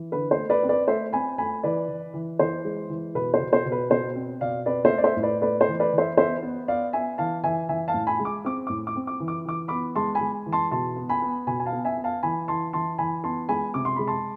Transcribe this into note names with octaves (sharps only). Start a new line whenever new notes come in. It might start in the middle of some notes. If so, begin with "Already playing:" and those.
Already playing: E3
D3 B4
C5
A3
B4 D5
C4
B4 D5
A3 C5 E5
C4 G#5 B5
A3 G#5 B5
E3 B4 D5
E3
E3
E3 C5
G#3
E3
B2 B4
C5
B2
C5
B2
B4
B2 C5
C4
B2 D5 F5
C4 B4 D5
C5 E5
A3
D5
C5 E5
A2
B4 D5
A3 B4 D5
C5
E3
B4 D5
E3
C5 E5
B3 C5 E5
B3
B3 D5 F5
B3 E5 G#5
E3 F5 A5
E3 E5 G#5
E3 E5 G#5
F5 A5
A2
G#5 B5
G#3
D6
C4 D6
A2 D6
D6
C4
D6
E3
D6
E3 D6
B3 B5 D6
G#3 A5 C6
G#5 B5
G#3
E3
A5 C6
B2 A5 C6
B3
G#5 B5
B3
B2 G#5 B5
G#5
F5 A5
B3
E5 G#5
B3
F5 A5
E3 G#5 B5
E3 A5 C6
E3 A5 C6
E3 G#5 B5
B3 A5 C6
G#3 G#5 B5
C3 D6
C6
G#3 B5
A5 C6